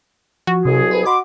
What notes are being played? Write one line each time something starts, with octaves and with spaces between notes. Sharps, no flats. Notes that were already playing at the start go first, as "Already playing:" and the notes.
F3 F#4
C2 C3 F#3 G#4
A4 B4 C5
F#4 D#5 B5 C6 D6